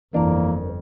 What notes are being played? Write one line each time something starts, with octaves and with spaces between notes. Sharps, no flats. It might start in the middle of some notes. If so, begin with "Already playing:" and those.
G1 F2 E3 A#3 D4 A#4